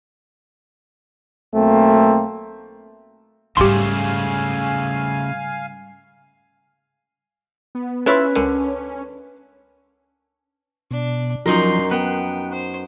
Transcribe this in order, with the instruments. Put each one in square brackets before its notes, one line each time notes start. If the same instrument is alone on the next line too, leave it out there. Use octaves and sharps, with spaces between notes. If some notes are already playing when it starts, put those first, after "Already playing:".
[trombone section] B1 A3 A#3 C4
[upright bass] G#2 G3 [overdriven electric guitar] C#3 A3 [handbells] G4 C6 [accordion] F5 G#5
[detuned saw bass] B3
[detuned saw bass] C#4 [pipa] E4 F4 E5 [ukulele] B4 [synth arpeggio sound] C#5 C6 C#6
[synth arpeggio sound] C#2 A#4 G#5 [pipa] D3
[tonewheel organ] B2 [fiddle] D4
[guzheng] F#2 D#4 A#4 [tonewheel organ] F3 F#3 [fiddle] C6
[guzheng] B3 [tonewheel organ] F#5 [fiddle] G5
[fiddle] C5